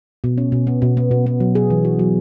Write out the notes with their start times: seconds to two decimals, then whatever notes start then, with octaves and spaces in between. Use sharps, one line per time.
0.24 B2
0.38 C#4
0.52 B2
0.67 B3
0.82 B2
0.97 B3
1.11 B2
1.26 B3
1.40 F#3
1.55 G#4
1.70 E3
1.85 F#4
1.99 F#3